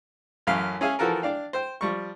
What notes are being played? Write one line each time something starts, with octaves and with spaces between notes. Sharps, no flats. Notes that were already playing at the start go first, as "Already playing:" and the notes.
A1 F#2 C#4 F5
C#4 G#4 E5 F5 G#5
E3 F3 F#4 A4 A#4
D4 D5 F5 G5
C5 G5
F3 G3 C#6